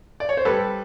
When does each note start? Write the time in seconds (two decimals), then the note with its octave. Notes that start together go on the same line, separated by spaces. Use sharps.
0.20 D5
0.29 C#5
0.37 C5
0.45 G3 A4 B4